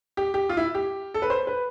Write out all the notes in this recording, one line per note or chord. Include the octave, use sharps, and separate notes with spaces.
G4
G4
F4
E4
G4
A4
B4
C5
B4